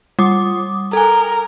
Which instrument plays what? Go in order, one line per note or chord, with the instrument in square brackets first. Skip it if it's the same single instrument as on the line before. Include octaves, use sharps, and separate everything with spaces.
[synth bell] G3 D6 D#6
[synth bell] A4 G#5 [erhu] A#4